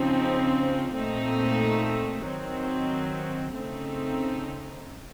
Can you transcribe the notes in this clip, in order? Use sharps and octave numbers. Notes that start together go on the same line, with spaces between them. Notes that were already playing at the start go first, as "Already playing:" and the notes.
Already playing: C#3 F3 C4 D#4
A#2 A3 C4 D#4
D#3 F#3 C4
C#3 A3 C4 D#4